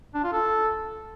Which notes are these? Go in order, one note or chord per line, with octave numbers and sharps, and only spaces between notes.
D4
F4
A4